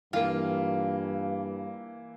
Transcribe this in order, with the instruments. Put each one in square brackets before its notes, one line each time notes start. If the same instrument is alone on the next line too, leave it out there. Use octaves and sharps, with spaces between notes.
[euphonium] G2 [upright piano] E3 A#3 [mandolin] F4